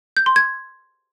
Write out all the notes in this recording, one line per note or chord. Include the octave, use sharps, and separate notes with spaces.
G6
C6
G#6